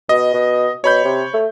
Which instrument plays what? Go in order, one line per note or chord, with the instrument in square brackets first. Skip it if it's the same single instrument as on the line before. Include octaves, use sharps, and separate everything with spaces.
[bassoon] B2 [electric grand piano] D#5
[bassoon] B2
[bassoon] B2 [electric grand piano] C#5 B5 G6
[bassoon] C3
A3